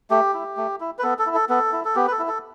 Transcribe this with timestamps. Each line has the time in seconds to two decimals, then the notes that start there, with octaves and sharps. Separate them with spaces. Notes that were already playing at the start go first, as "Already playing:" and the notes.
0.10 A3 G4
0.34 E4
0.57 A3
0.80 E4
0.99 B4
1.03 B3 A4
1.19 A4
1.26 E4
1.34 A4
1.49 B3 A4
1.73 E4
1.85 A4
1.96 B3 G4
2.07 B4
2.11 A4
2.19 E4
2.28 A4